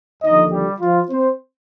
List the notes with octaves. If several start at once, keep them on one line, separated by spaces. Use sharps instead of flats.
D#2 D3 F3 D#4 D#5
G3 G4
F3 F4
C4 C5